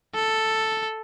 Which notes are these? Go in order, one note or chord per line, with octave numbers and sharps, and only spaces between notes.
A4